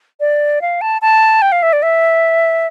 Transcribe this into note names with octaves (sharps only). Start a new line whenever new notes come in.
D5
F5
A5
A5
G5
F5
E5
D5
E5